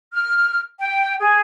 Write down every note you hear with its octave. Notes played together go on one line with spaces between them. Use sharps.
F6
G5
G#4